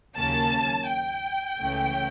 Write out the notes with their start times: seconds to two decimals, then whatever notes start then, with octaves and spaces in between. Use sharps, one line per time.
0.16 D#2 C#3 F#3 A#3 C#4 A5
0.88 G5
1.59 C#2 C#3 E3 A3 C#4